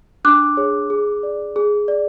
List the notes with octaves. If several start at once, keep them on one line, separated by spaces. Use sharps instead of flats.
D4 D6 F#6
G#4 C#5
G#4
D5
G#4
D5